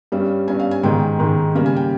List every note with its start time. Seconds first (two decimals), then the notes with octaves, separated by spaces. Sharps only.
0.12 G2 G3 C#4
0.48 G2 G3 C#4 G#5
0.60 F5
0.71 G#5
0.83 G#2 D#3 G#3 G5
1.19 G#2 D#3 G#3
1.55 C#3 G3 A#3
1.66 G#5
1.76 G5